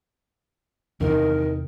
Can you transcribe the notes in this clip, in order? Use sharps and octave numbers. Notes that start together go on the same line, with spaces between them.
E2 C3 D#3 E3 D#4 A#4